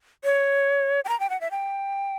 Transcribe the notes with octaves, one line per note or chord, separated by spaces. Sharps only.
C#5
G5
A#5
G5
F#5
E5
G5